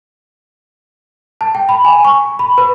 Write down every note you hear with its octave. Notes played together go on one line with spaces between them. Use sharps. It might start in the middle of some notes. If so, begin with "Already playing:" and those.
A5
G5
B5
G#5
C#6
B5
B4